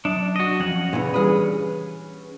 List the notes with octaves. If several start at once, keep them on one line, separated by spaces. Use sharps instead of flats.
F#3 D4
F#4 D#5
F2 C#4 F#5
A#2 C#3 E3 D4
E3 G3 G4 G#4 B4